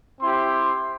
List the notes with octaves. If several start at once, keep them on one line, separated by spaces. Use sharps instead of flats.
C4 E4 G4 C6